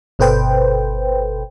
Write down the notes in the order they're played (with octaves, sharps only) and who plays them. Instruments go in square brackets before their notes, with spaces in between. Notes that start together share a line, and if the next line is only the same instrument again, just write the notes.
[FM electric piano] G1 B2 A4 B4 C5 G5